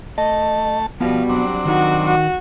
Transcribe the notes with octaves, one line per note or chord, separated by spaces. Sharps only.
A3 D#5 A5
F3 G3 B3 F#4
F#3 C4 D4
D#3 D#4 F#4
F#4